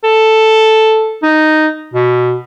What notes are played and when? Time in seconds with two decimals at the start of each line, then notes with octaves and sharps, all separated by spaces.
0.04 A4
1.23 D#4
1.94 B2